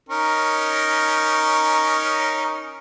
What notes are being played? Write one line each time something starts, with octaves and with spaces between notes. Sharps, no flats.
C#4 D#4 A#4